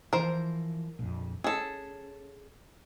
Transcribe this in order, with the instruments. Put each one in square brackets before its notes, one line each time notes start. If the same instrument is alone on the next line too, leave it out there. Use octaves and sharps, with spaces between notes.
[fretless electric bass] E3 F3 [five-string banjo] A#4 C5
[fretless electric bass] A#1 F2
[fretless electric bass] C#4 [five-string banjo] G#4 A4